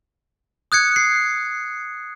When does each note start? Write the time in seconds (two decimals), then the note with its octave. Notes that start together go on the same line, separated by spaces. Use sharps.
0.72 D#6 F#6 G#6 C#7
0.96 C7